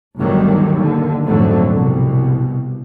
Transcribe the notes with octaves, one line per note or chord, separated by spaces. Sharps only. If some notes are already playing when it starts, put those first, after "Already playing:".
G1 D2 A#2 D#3 F#3 G3
D#2 D3
A#1 F2 G#2 D3 F#3 A3
C2 B2